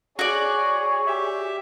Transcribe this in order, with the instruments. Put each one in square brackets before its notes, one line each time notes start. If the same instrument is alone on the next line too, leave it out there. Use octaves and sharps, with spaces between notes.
[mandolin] F#4 D5 [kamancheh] G#4 [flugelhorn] C#5
[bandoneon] G4 E5